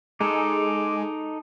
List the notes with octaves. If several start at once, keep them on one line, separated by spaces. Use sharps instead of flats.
G#3 D#4 A4 D6